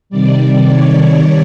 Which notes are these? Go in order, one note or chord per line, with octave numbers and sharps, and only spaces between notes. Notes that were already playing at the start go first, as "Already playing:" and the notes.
C3 D#3 G3 D5
C#5